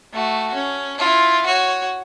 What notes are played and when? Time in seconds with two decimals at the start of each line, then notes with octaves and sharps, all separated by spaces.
0.13 A3 F#4
0.54 C#4
0.98 E4 F4
1.46 F#4 C#5